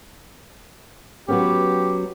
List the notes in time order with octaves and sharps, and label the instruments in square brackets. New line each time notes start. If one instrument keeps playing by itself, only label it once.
[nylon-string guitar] F#3 B3 C#4 [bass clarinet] G4